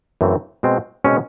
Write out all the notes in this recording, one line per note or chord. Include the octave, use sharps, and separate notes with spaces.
F#2 C#3 E3 A3 C4
B2 G#3 C4
B2 G#3 C4 C#4